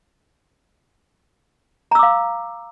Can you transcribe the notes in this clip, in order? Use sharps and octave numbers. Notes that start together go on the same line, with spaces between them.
F5 A#5 D6 E6